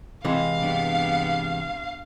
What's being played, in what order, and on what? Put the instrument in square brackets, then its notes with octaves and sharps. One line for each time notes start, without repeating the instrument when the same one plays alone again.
[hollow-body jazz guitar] C3 E3 G#3 [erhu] F5
[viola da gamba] G2 B3